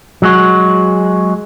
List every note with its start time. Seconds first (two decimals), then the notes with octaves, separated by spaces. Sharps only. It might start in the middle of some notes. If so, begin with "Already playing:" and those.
0.22 F#3 G#3 F#4